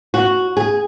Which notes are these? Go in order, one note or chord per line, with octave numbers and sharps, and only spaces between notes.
F#4
G#4